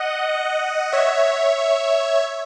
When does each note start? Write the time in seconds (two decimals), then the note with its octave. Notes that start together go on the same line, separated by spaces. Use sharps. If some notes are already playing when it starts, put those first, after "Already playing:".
Already playing: D#5 F#5
0.92 C#5 E5